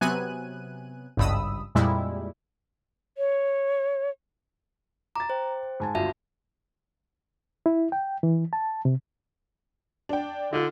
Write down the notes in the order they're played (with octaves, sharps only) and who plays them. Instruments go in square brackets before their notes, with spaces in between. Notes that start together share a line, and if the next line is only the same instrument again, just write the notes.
[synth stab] C3 F#3 B3 G#5 F#6 D#7
G#1 C#2 G2 B5 D#6 E6
F2 A#2 G3 G#3 E4
[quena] C#5
[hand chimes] A#5 [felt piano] D6 A6
[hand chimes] C5 G5
[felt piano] G#2 G#5 A5
[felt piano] G1 C#2 [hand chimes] F#4 E5 A5
[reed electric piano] E4
G5
E3
A5
C3
[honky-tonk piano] D4 G5
[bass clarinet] D3 [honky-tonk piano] D#4 F4